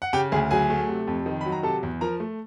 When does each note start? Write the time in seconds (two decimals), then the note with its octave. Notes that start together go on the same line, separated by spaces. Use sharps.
0.02 F#5
0.13 C#3 G4 G5
0.32 D2 G#4 G#5
0.51 F#3 G#4 G#5
0.70 A3
0.89 C3
1.07 F2
1.26 D#3
1.41 F#3 B5
1.52 A#5
1.63 C3 A4 A5
1.83 E2
2.01 F3 A#4 A#5
2.20 A3